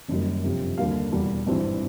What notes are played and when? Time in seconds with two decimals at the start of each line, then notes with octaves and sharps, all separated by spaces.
0.08 F#1 F#2 D#3 G3
0.44 G1 F2 C3 F3
0.78 D#2 D3 G3 A#3 F5
1.12 E2 B2 G3
1.47 G#1 G2 E3 G3 C4